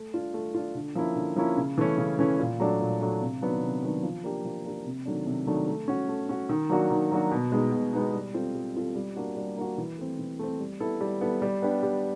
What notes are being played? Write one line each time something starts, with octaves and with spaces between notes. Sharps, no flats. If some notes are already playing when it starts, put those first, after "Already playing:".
Already playing: A3
D4 F4
A3
D4 F4
D3
F3 A#3 C#4 E4
D3
F3 A#3 C#4 E4
C#3
E3 A3 C#4
C#3
E3 A3 C#4
A#2
F#3 A3 D4
A#2
F#3 A3 D4
C3
D#3 F#3 B3 D4
C3
D#3 F#3 B3 D4
F3
A#3 D4 G4
F3
A#3 D4 G4
C3
D#3 F#3 A3 D4
C3
D#3 F#3 A3 D4
A3
C#4 F#4
A3
C#4 F#4
D#3
F#3 A#3 D4 F#4
D#3
F#3 A#3 D4 F#4
B2
G#3 B3 D#4
B2
G#3 B3 D#4
G3
C4 F4 A4
G3
C4 F4 A4
G3
A#3 D4 F#4
G3
A#3 D4 F#4
E3
A3 C4
E3
A3 C4
G3
B3 E4 A4
G3
B3 E4 A4
G3
B3 D4 G4
G3